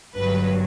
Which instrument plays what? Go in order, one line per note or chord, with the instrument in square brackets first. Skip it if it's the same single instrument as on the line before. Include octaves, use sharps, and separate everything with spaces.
[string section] G1 G2 F#3 B4